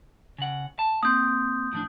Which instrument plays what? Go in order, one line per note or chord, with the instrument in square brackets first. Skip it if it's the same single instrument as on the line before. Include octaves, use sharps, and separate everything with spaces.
[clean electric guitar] C#3 F#5
A5
[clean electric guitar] A#3 C4 [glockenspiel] D#6 G6
[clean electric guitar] A2 F3 D4